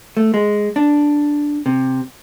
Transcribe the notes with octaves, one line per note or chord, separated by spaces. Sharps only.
A3
G#3
D4
C3